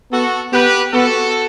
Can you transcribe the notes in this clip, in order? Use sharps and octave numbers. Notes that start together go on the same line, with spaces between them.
B3 F#4 A4
B3 G4 B4
B3 F#4 A4